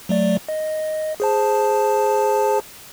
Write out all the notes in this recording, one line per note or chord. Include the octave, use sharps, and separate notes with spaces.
F#3 A3 D5
D#5
G#4 C5 A5